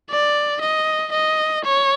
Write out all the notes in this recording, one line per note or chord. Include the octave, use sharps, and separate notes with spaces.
D5
D#5
D#5
C#5